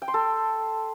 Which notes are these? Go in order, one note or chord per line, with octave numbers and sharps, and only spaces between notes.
G5
C6
A4